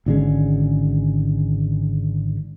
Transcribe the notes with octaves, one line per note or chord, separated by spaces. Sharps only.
G#1 D3 G#3 C#4